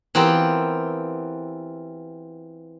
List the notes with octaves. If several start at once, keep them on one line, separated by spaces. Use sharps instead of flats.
E3 B3 C4 F4 G4 A#4